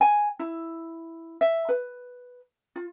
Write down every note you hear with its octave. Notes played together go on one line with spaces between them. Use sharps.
G#5
E4
E5
B4
F4